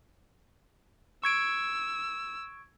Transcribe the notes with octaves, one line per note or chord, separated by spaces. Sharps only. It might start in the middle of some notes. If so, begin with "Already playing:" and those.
C#6 E6 G#6 D7